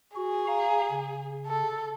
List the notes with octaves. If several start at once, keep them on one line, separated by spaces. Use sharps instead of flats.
F#4 G#4
F5 A#5
C#3
A4